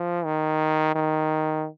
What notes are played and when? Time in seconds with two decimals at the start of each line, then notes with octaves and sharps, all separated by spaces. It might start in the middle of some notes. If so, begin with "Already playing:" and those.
Already playing: F3
0.25 D#3
0.95 D#3